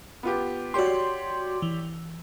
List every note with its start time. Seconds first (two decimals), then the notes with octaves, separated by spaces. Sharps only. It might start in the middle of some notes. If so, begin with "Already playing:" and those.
0.23 B3 F4 G4
0.74 F#4 G4 C#5 D5 C6
1.62 E3